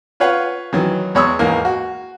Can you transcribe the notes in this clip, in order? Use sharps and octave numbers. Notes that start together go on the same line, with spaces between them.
F4 B4 C#5 F5 F#5
D#3 E3 F#3
E2 G#3 C#5 B5 D#6 E6
D#2 G#2 E3 A#3
F#4